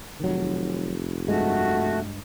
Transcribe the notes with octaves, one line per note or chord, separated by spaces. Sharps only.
F1 D#3 F#3
G2 G#3 A3 F#4